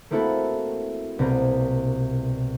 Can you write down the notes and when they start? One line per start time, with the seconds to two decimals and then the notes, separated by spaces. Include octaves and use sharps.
0.11 A3 A#3 C4 E4 F#4 A4
1.19 C2 B2 A#3 C4